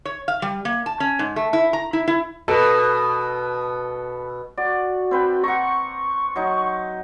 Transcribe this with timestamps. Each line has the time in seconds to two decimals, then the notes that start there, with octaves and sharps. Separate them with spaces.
0.05 C#5
0.28 F5
0.42 G3
0.65 A#3
0.86 A5
1.00 C#4
1.19 G#2
1.36 A3
1.53 E4
1.73 A#5
1.93 E4
2.08 E4
2.48 B2 A4 B4
4.57 F#4 D5
5.11 C4 B4 G5
5.44 F#5 A#5 C#6
6.36 F#3 D#4